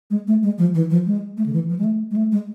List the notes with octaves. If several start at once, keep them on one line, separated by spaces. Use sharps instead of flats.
G#3
A3
G#3
F3
E3
F3
G#3
A3
D3
E3
F3
G#3
A3
G#3
A3
G#3